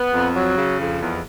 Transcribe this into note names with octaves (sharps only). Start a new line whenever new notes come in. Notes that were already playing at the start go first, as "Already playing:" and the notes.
Already playing: B3
F2
F#3
C#3
F2
E2